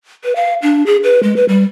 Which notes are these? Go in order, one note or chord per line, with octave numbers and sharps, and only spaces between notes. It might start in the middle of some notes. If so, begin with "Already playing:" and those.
B4
F5
D4
G#4
B4
G#3
B4
G3